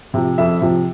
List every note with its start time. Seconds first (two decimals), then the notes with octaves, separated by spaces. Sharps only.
0.14 C3 F3
0.38 F2 E5
0.62 C3 F3